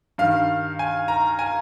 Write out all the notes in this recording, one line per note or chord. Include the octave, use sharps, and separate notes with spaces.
G2 D#3 F5
G#5
A#5
G#5